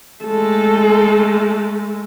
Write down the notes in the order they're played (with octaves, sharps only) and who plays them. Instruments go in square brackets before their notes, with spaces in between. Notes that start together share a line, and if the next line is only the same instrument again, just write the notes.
[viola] G#3 A3 [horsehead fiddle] A4